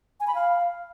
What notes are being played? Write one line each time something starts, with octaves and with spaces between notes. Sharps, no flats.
G#5
B5
F5